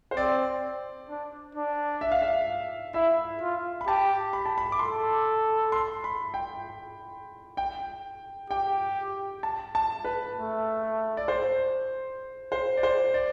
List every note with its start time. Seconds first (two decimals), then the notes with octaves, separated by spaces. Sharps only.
0.11 C5
0.17 C4 D5
1.09 D4
1.55 D4
2.01 E5
2.11 F5
2.22 E5
2.94 E4 E5
3.41 F4
3.81 B5
3.87 G4 A5
4.33 B5
4.46 A5
4.58 B5
4.72 D6
4.79 A4 C6
5.72 C6
6.04 B5
6.34 G5
7.57 G5
8.50 G4 G5
9.43 A5
9.75 A5
10.05 B4
10.36 A3
11.17 D5
11.28 C5
12.52 C5
12.77 D5
12.83 C5
13.14 D5